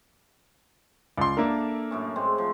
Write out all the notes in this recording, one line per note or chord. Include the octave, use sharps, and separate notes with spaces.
C#2 D5 C6
A#3 D4 A4 A#4 E5
F#2 A2 C#4
A2 G#3 C4
F3